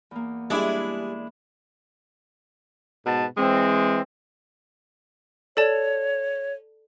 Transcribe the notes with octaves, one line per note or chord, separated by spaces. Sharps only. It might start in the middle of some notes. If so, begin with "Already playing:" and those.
E2 A#3
G3 G#3 D4 E4 G#4
G#2 B2 B4 A5
E3 G#3 C4
A4 C#5 D5 A5